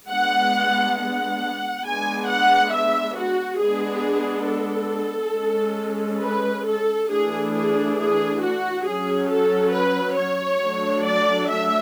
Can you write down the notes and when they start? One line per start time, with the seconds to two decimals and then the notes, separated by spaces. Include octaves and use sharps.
0.10 G#3 B3 D4 F#5
0.98 F#5
1.85 G#3 B3 D4 G#5
2.29 F#5
2.73 E5
3.17 F#4
3.60 G#3 B3 D4 G#4
4.48 A4
5.35 G#3 C#4
6.23 B4
6.66 A4
7.11 E3 A3 D4 G#4
7.54 G#4
7.98 G#4
8.42 F#4
8.86 F#3 C#4 G#4
9.30 A4
9.73 B4
10.17 C#5
10.61 F#3 A3 D4
11.04 D5
11.49 E5